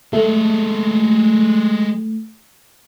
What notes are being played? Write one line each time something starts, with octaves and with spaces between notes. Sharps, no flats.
G#3 A3 A4